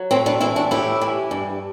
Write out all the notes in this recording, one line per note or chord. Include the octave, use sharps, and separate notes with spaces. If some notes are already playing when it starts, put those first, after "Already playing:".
Already playing: F#3
A2 C4 E4
B3 D4
E3 C4 E4
D4 F#4
A2 E4 G4
E3
G2